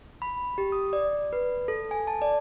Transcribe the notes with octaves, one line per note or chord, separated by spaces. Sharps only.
B5
G4
D#6
D5
B4
A4
G#5
A5
D5